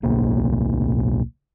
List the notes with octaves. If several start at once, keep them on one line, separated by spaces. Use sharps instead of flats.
D1 B1 A#3